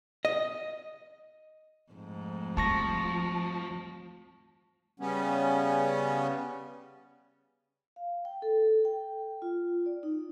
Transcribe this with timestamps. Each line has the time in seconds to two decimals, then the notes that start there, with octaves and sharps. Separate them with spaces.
0.25 D#5
1.92 F2 G#2 A3
2.57 F3 G3 A5 C#6 A#6
5.00 C#3 G3 B3 C#4
7.96 F5
8.25 G5
8.42 A4
8.85 G5
9.42 F4
9.86 D5
10.03 D#4